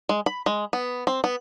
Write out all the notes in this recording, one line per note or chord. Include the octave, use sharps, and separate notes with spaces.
G#3
B5
G#3
B3
C4
B3